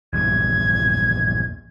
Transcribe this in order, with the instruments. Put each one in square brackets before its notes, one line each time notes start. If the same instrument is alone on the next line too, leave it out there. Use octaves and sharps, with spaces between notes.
[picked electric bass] A#1 E2 G2 [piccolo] G#6